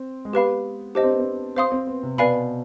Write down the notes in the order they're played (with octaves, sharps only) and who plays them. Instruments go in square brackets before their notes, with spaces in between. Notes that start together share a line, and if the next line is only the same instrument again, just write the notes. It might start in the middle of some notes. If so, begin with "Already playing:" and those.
Already playing: [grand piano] C4
G#3
[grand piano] B3 [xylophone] G4 B4 F5 B5
[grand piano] D4 [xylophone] G4 C5 D#5
[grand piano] C4
B3
C4
[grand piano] C4 [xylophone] C5 F5 C6 D#6
[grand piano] C4
B3
C3
[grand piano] B2 [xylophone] B4 D5 F5 G#5 B5